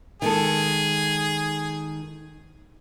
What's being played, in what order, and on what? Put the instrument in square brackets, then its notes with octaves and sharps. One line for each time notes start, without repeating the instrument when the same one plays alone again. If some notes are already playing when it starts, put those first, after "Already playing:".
[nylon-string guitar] D#3 G#3 A4 [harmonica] G#4